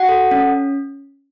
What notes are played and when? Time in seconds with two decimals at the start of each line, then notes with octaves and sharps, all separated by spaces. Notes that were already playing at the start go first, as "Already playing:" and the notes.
Already playing: F#4 F#5
0.09 A4
0.31 C#4